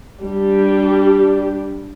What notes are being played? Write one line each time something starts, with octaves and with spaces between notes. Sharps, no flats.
G3 D4 G4